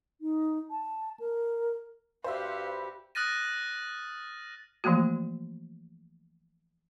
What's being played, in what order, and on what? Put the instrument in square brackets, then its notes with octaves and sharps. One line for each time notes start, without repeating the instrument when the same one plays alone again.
[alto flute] D#4
A5
A#4
[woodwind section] G2 B5 [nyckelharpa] F#4 G4 [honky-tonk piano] C5 E5 [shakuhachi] F5
[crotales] D#6 F6 F#6 A6 A#6 D#7
[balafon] E3 F3 A3 A#3 F#4